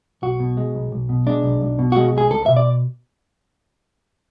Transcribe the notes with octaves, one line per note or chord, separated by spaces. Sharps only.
B1 F#4
B2
G#3
B1
B1
B2
G#3 D4
B1
B1
B2
G#3 F#4
B1 G#4
C#2 A4
B2 E5
D5